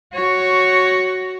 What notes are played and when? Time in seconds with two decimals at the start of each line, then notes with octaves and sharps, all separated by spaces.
0.13 F#4 C#5